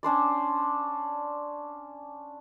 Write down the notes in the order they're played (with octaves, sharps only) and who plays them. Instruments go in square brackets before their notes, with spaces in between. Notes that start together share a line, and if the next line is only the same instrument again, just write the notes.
[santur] C#4 D4 C5 D5